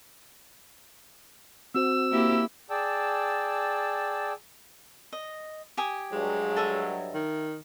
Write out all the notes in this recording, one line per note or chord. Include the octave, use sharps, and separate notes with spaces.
C4 F#4 C5 E6
A#3 E4 G4
G#4 D5 G5 A5 E6
D#5
G4 G#5 D#6
G2 F#3 G#3
A4 D#5 E5
D#3